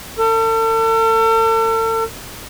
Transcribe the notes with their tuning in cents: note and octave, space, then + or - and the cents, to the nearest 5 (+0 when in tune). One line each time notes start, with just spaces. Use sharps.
A4 +40